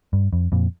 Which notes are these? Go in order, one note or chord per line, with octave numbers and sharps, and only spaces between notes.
G2
F2
F2 A#2